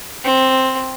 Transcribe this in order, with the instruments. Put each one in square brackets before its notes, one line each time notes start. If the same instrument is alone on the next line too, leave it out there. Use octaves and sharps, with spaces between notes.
[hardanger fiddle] C4